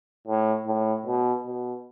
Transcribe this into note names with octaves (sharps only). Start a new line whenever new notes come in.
A2
A2
B2
B2